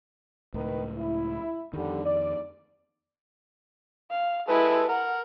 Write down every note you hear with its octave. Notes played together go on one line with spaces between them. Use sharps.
C#2 A2 D#3 A#4 B4
E4
F2 D3 D#3 G3
D5
F5
G#3 E4 A4 B4
A#4 F#5